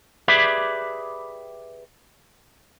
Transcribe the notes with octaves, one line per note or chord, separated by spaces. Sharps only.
G4 G#4 B4 D5 E5 B5